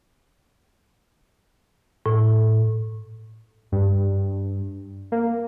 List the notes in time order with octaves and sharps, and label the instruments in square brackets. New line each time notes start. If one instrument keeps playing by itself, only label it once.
[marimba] A2
[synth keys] G2
A#3